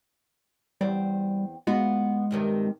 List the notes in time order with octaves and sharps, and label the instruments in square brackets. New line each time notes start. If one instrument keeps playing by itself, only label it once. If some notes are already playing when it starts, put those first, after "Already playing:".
[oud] E2 C4 D5 [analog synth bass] G3
[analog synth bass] G#3 [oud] B3 F4 F#4
[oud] G2 C3 D#3